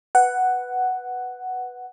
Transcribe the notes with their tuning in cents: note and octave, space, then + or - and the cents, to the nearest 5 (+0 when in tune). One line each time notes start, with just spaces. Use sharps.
B4 +0 F#5 +5